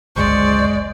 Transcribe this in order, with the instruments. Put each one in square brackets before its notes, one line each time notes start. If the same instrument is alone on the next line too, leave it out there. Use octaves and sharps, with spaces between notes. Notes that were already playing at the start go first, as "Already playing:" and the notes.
[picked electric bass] G1 C#2 F#2 [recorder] G#3 [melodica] C5 C#6 [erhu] D5